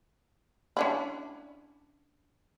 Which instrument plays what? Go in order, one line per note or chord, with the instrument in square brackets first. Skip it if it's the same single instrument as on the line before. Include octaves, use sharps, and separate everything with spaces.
[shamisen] C#4 D4 E4